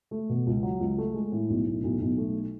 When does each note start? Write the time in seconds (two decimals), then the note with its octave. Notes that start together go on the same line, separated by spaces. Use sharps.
0.11 A3
0.29 B2
0.47 C#2
0.63 F#3
0.81 C#2
0.98 A3
1.14 G#3
1.32 A2
1.50 B1
1.67 A2
1.83 B1
2.01 B1
2.18 A3